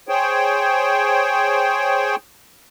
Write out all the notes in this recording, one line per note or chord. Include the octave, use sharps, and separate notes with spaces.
G#4 C5 C#5 G5